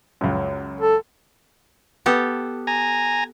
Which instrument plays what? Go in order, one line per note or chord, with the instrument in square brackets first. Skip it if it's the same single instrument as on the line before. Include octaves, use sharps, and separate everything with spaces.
[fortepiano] C#2 F#2
[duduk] A4
[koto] B3 G4 A4
[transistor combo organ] G#5 A#5